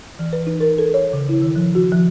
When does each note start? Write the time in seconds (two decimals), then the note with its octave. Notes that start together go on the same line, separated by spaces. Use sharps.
0.19 E3
0.33 B4
0.47 D#4
0.60 A#4
0.78 A4
0.94 C#5
1.13 C#3
1.29 E4
1.42 D#3
1.56 F3
1.75 F#4
1.92 F3